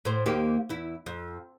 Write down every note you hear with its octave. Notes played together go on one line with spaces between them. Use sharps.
A2 C5
D#2 A#3 G4
E2 E4
F2